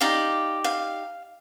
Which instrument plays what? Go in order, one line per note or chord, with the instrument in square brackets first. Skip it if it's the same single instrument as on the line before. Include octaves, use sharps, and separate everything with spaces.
[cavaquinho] D#4 G4 D5 F5
F5